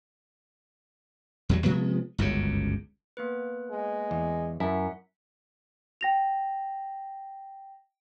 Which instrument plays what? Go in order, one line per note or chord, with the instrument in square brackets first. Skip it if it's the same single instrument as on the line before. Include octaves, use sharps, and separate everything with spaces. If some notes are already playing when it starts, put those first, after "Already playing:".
[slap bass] E2 F#3 G3
C3 F3 G#3 B3
G1 C#2 F#2 C#3
[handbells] A#3 B3 B4
[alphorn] G#3
[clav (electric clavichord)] E2
[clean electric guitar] F#2 [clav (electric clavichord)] E4 [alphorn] A#4 [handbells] E5 F#5
[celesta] G5 A#6 F7